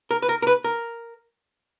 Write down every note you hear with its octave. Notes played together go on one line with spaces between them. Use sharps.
A#4
B4
A#4
A#4
B4
A#4